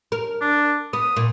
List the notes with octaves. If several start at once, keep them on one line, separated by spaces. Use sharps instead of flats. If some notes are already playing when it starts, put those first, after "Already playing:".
A#4
D4
B3 D#6
A#2